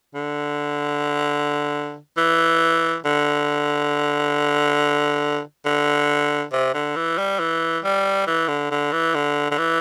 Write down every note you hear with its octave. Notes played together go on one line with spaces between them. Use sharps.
D3
E3
D3
D3
C3
D3
E3
G3
E3
G3
E3
D3
D3
E3
D3
D3
E3